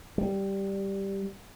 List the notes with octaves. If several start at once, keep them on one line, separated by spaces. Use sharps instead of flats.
G3